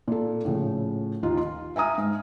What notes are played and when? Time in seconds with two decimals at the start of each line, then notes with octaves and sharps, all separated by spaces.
0.08 A#2 A4
0.45 A2 C#3 F3
1.23 D#2 D#4 F4
1.37 C6
1.76 E5 G#5 A#5 D#6 F6
1.98 G#2